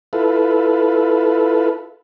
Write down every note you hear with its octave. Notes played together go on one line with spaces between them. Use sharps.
E4 F4 A4 B4